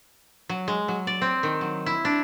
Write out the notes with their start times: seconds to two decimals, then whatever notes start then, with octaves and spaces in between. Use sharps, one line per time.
0.49 F#3
0.68 G#3
0.88 F#3
1.07 D5
1.21 C4
1.43 D#3
1.61 F#3
1.86 E4
2.05 D4